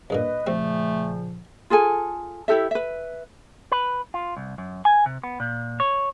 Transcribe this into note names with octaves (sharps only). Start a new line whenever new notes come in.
C2 G2 A#2 B4 D#5
A#2 C#3 F3 G3 A3 C4
F4 G#4 A4 G#5
E4 G4 A4 E5
B4 E5
B4
F4
C2
F#2
G#5
C3
B3
A#2
C#5